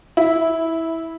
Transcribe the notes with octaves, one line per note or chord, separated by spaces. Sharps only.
E4